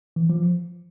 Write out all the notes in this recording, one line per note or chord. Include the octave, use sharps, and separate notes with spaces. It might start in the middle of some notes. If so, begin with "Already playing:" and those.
E3
F3